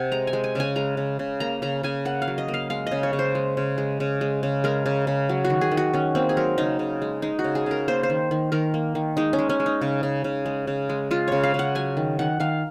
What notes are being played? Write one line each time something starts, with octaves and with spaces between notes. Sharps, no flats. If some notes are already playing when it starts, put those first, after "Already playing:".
Already playing: C3 F#5 G#5
G#3 A#5
G#5
G#3
G#5
C#3 G#5
G#3 A#5
C#3
C#3
A#3 A#5
C#3 A#5
C#3 G#5
A#3 F#5
F5
F#3
D#5
A#3
F5
G#3 F5
C#3 D#5
C#5
C#3
C5
G#3
C#3
G#3
C#3
G#3
C#3
G#3 A#4
C#3
C#3
F#3
F#4
D#3
G#4
D#3
F#4
D#3 C#4
A#3 C4
G#4
F#3 A#4
C#3 D#4
C#3
G#3
G#3 D#4
F#4
C#3
G#4
C#3 A#4
A#3 C5
C5
D#3
D#3
D#3 A#4
A#3
D#3
G#3 D#4
C#4
G#3
C#4
G#3
D#4
C#3
C#3
C#3
G#3
C#3
G#3
G#3 F4
C#3 C#5
F5
C#3 F#5
F#3 G#5
D#3
D#3 F#5
D#3 F5